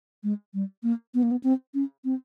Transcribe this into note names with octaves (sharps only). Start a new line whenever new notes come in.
G#3
G3
A#3
B3
A#3
B3
C4
C#4
C4